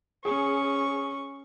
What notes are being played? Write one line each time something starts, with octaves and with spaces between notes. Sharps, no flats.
C#4 G#4 C#6